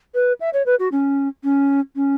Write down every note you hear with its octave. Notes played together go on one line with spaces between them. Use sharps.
B4
E5
C#5
B4
F#4
C#4
C#4
C#4